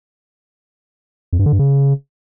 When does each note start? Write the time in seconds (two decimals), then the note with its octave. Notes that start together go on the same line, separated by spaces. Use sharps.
1.33 F2
1.39 G2
1.46 D3
1.52 G2
1.59 C#3